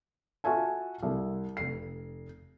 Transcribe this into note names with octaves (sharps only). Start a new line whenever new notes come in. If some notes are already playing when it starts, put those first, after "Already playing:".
F4 F#4 E5 G#5 A5
C2
F1 C7